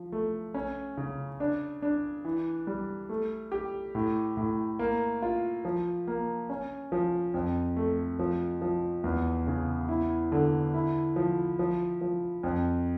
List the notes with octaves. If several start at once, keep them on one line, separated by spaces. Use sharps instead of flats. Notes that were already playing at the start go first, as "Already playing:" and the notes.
Already playing: F3
A3
C#4
C#3
D4
D4
E3
G3
A3
G4
A2
A2
A#3
F4
F3
A#3
C#4
F3
F2
A3
F3
F3
E2
C#3
E4
D3
E4
F3
F3
F3
F2